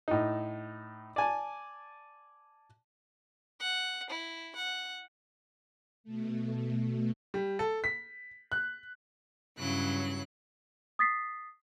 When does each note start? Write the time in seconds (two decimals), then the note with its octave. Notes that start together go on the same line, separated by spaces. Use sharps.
0.08 A2 D#4
1.16 D5 G#5 A5
3.60 F#5
4.10 E4
4.56 F#5
6.04 B2 A3
7.34 G3
7.59 A4
7.84 B6
8.52 F#6
9.58 G2 C#3 F#3 E4 F#6
10.99 D#6 A6 B6 C7